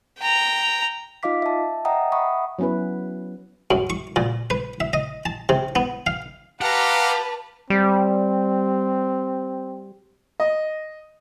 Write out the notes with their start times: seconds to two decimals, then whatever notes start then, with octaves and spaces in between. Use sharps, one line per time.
0.19 G5 A#5
1.23 D#4 F4 D#5 F5 D6 B6
1.42 E5 A5
1.85 D#5 E5 F#5 G5 A#5 D#6
2.12 E5 F#5 B5 C#6 D#6
2.59 F#3 B3 C#4 E4 B4
3.71 F#2
3.90 C#6
4.16 A#2
4.50 B4
4.80 E5
4.93 D#5
5.26 A5
5.49 C3
5.76 B3
6.07 F5
6.61 G4 B4 F5 F#5 A5 A#5
7.70 G3 C4
10.40 D#5